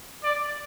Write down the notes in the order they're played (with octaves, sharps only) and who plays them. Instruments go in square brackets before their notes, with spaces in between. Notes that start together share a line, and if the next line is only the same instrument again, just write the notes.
[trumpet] D5